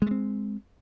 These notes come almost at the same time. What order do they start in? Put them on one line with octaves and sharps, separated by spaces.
G#3 A3 C4